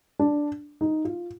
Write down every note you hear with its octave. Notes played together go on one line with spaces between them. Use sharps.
D4
D#4
F4